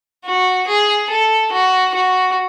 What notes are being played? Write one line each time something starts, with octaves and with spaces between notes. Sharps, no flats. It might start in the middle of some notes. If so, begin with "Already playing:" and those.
F#4
G#4
A4
F#4
F#4